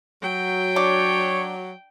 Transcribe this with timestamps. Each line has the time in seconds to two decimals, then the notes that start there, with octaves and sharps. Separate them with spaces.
0.23 F#3 G5
0.76 D4 C#5